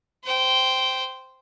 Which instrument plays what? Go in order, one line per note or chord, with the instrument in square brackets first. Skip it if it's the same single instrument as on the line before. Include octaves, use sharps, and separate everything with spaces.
[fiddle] C5 G5